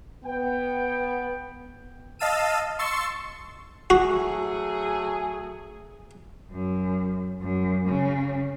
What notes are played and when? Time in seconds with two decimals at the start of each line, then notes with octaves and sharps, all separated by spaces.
0.25 B3 G5
2.19 D#5 F5 A5 E6 D#7
2.79 C6 C#6 E6 A6 C#7
3.90 F#3 A3 F#4 G#4
6.51 F#2
7.39 F#2
7.85 C#3